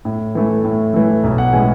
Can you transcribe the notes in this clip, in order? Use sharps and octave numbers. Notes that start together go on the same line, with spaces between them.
A2
E3 A3
A2
E3 A3
B1
F#5
A2 E3 G#3 C#4 G#5